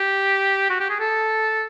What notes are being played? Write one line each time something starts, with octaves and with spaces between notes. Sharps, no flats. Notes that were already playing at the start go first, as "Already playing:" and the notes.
Already playing: G4
F#4
G4
G#4
A4